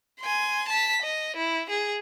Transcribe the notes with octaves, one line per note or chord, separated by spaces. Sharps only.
G#5 C6
A5 B6
D#5
E4
G#4